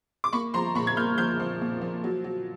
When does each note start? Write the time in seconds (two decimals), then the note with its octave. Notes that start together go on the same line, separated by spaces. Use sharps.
0.24 D6
0.33 A#3 B5 C#6
0.54 F3 A#5 C6
0.75 A#2 B5 C#6
0.87 G#6
0.97 A#3 F6 G6
1.18 F3 F6 G6
1.40 F3
1.61 A#2
1.81 F3
2.04 F#3
2.24 F#3